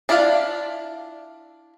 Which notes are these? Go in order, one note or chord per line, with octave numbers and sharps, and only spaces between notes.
D4 E4 F4 D5 F5